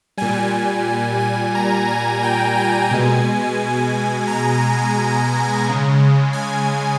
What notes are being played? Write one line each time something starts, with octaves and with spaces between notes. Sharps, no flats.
A#2 G3 G#5
G#5
A#5
G#5
G5
G#5
B2 G#3
A#5
C#3 G#3
G#5